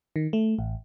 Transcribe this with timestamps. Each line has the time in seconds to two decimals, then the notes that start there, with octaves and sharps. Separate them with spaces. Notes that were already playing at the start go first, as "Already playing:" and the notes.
0.16 D#3
0.33 A3
0.59 A1